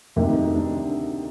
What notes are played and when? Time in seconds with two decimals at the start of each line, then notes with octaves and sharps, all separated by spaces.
0.16 D2 C3 D#3 D#4
0.29 D#4
0.42 D#4
0.55 D4